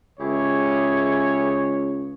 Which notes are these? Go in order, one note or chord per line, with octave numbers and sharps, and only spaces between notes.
C#2 E4 G4 G#4 C#5